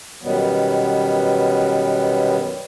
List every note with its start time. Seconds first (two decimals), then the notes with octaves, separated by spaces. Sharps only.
0.23 F#2 B2 D#3 F#3 G3 B3